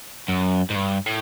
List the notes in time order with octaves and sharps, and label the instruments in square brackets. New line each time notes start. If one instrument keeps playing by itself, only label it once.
[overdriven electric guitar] F#2
G#2
G2
A2